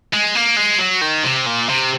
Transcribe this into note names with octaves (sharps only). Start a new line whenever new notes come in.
G#3
A#3
G#3
F#3
D#3
C3
A#2
C3